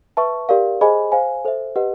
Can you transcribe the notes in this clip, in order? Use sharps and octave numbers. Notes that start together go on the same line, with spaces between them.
B4 E5 A5 C#6
G4 A#4 D5 F5
G#4 C5 D#5 G#5 B5
C5 F5 G#5
A4 C5 E5
G4 B4 D#5 F#5